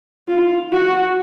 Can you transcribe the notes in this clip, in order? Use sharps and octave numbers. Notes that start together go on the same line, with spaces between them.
F4
F#4